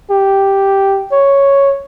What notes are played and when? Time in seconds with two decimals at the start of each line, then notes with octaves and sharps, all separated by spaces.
0.11 G4
1.12 C#5